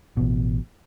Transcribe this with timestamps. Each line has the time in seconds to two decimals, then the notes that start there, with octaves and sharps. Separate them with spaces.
0.17 A1 B2